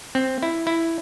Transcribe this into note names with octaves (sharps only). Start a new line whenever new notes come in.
C4
E4
E4